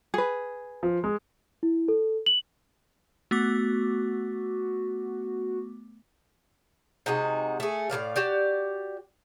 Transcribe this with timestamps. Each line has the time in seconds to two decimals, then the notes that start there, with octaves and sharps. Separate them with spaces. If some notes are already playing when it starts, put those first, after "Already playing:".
0.14 G#4 B4
0.83 F3
1.04 G#3
1.63 E4
1.88 A4
2.26 F#7
3.31 A3 B3 F#4 D6
7.06 C3 G#3 D#4 F#4
7.60 A3 G#4
7.90 A2 F#3 D5 F5
8.16 F#4 G4 D5